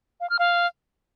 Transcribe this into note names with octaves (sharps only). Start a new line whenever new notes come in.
F5
F6
F5